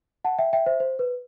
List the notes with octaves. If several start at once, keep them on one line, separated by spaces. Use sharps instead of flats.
F#5 A5
E5 G5
E5 G5
C5 E5
C5
B4